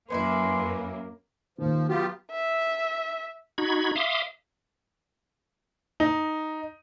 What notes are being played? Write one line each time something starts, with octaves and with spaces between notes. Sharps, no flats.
F#2 A#3 C#4 D#4 E4 B4 C6
D#2 D#3 F3
F#3 B3 F4 G4
E5
D#4 F#4 B5 G#6
E5 F5 C6 D6 D#6
D#4